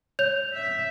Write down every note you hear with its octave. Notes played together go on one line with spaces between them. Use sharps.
C#5 G6 F7
E5